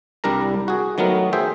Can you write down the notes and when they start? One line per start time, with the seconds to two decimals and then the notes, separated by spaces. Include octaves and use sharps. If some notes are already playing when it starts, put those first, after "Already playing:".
0.24 C2 G3 D4 A#4 A#5
0.68 F#4 G#4
0.98 D#3 F#3 A3 B3 A#4
1.33 G#4 C5 E5 G5